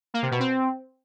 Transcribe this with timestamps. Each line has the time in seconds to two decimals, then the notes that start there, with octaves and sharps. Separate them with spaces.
0.14 A#3
0.22 C3
0.31 B2
0.40 C4